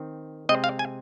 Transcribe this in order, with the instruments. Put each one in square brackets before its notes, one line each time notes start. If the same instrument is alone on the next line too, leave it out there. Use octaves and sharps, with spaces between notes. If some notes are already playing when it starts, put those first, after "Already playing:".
Already playing: [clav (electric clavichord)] D#3 C4
C3 G#3 C4 D#5
F5
G#5